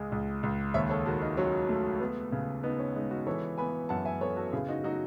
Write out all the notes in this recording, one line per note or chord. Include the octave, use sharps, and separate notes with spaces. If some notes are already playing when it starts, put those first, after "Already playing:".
Already playing: C#2 G#3
C#2
C#2
D#2 C#5 E5
A4 C#5
D#3 F#4 A4
D#4
F#3 C#4
A3
B3
C#3
B3 D#4
C#4
G#3 D#4
D#4 F#4
E3 A4 C#5
B3 G#5 B5
F#2 F#5 A5
E5 G#5
B3 A4 C#5
F#4 A4
C#3 E4 G#4
D#4 F#4
F#3 D#4 F#4